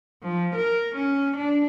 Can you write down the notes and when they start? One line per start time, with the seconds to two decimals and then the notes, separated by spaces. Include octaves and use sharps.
0.23 F3
0.55 A#4
0.95 C#4
1.36 D4